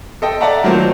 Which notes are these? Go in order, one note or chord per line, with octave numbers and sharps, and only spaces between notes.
A4 D#5 G5
D5 E5 F#5 A5 A#5
D#3 F#3 A3 A#3 C4 F4